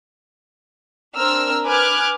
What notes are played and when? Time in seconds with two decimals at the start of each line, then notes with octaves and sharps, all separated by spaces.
1.15 C4 D4 A#4 E6 F6
1.65 B4 G#5 D6 F6 F#6 G#6